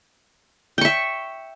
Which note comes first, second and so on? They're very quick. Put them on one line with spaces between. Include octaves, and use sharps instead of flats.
G5 C#6 E5